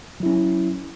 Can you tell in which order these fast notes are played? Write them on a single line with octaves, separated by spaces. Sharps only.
F#3 E4 C#4